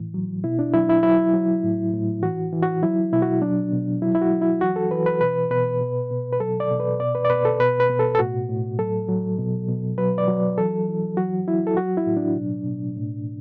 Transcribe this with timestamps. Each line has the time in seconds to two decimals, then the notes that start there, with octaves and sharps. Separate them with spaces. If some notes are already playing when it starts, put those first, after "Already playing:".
Already playing: A2 E3
0.14 F#3
0.44 B2 E4
0.59 D4
0.74 F#3 E4
0.89 E4
1.03 F#3 E4
1.34 F#3
1.63 A2
1.93 A2
2.22 E3 F#4
2.53 E3
2.62 F#4
2.83 F#3 E4
3.12 B2 E4
3.22 F#4
3.42 F#3 D4
3.72 B2
4.02 F#3 E4
4.15 E4
4.22 F#4
4.32 F#3
4.41 E4
4.61 E3 F#4
4.76 A4
4.91 E3 B4
5.06 B4
5.21 B2 B4
5.51 B2 B4
5.80 B2
6.11 B2
6.33 B4
6.40 F#3 A4
6.60 D5
6.70 B2
6.80 B4
7.00 B2 D5
7.15 B4
7.25 D5
7.30 B2 B4
7.45 A4
7.60 B2 B4
7.80 B4
7.90 B2
7.99 A4
8.15 A4
8.19 A2 F#4
8.49 A2
8.79 F#3 A4
9.09 F#3
9.39 B2
9.68 B2
9.98 F#3 B4
10.18 D5
10.28 F#3
10.58 E3 A4
10.88 E3
11.17 F#3 F#4
11.47 F#3 E4
11.67 A4
11.77 F#3 F#4
11.97 E4
12.06 A2
12.17 D4
12.36 B2
12.67 B2
12.97 A2